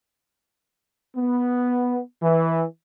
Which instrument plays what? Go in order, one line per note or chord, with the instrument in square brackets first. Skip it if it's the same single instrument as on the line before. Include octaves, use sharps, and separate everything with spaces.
[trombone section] B3
E3